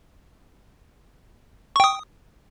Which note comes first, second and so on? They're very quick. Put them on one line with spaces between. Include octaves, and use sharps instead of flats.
C#6 G5 D#6